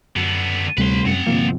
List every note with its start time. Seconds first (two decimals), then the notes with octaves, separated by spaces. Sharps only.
0.16 F#2 D3 B3
0.78 D2 C3 G3 A3 B4 C6
1.06 F#2 C4 F#5
1.27 G1 C3 F3 A#3